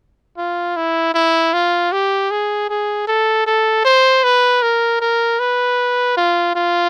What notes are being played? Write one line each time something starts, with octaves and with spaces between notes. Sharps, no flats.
F4
E4
E4
F4
G4
G#4
G#4
A4
A4
C5
B4
A#4
A#4
B4
F4
F4